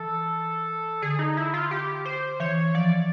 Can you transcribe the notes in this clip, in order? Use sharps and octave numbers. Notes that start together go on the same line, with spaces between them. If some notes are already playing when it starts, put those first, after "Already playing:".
Already playing: E3 A4
D3 G#4
D#4
E4
F4
G4
C5
E3 C#5
F3 D5